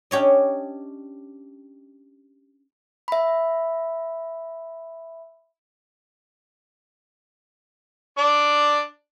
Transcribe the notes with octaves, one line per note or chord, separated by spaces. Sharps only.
C#4 D4 G4 C#5 D#5
E5 B5
D4 D5